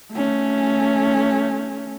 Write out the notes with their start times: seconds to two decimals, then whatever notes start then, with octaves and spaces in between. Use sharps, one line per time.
0.13 A3 C#4